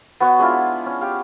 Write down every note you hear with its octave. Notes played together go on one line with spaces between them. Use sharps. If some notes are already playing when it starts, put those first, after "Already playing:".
B3 F#4 C#5 F#5
G#3 D4 E4 F4
C#4
G4 F5